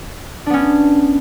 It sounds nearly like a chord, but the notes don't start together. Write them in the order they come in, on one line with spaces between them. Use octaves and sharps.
D4 B3 C#4